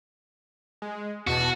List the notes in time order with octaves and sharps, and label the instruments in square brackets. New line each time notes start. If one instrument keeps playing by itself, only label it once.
[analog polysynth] G#3
[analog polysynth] E2 B2 A5 [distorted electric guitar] F#4